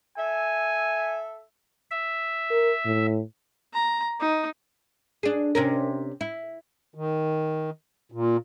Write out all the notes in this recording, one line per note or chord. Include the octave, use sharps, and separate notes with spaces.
A4 E5 G#5
E5
A#4
A2
A#5
D#4
D4 G#4
C3 C#4 A#4
E4
D#3
A#2